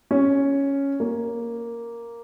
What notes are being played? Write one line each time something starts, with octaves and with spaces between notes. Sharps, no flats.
C#4
A#3